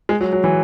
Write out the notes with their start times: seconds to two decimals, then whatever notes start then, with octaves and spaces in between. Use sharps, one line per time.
0.09 G#3
0.21 F#3
0.32 F#3
0.44 E3